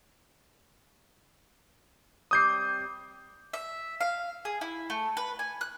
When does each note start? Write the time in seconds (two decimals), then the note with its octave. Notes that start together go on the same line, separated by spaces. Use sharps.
2.31 C3 G3 D6 D#6 G6 C7
3.53 E5
4.01 F5
4.45 G#4
4.61 E4
4.90 A3
5.17 B4
5.39 G#5
5.61 F#6